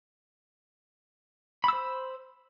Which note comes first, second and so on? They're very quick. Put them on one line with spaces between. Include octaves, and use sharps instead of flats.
B5 E6 C5